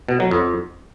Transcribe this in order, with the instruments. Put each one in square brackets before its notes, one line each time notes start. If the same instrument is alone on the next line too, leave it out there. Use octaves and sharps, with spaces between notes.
[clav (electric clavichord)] B2
F#3
F2